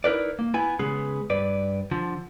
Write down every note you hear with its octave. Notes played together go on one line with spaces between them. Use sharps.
D#4 E4 A#4 B4 D5
A#3
B3 E4 G#5
C#3 G#3 B3 G#4 B4
G2 B4 D5
D3 F3